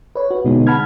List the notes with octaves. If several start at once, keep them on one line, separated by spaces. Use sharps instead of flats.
B4 C#5
F#4
B2 D3 G#3 B3 D#4
F#5 A5 B5 F6 G#6